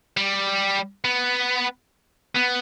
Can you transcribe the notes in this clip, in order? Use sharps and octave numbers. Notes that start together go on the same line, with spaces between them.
G3
B3
B3